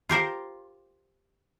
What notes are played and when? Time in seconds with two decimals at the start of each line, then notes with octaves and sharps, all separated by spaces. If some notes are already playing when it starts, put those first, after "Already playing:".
0.09 F4 G4 A#4 C5